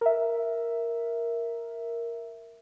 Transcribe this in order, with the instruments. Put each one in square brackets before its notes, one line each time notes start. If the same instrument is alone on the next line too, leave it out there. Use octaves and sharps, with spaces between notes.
[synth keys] A#4 E5